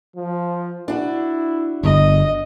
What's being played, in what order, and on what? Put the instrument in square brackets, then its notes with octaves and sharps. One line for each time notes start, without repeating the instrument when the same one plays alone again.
[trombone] F3
[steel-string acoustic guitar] D4 F#4 [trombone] E4
[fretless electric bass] G1 [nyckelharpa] D#5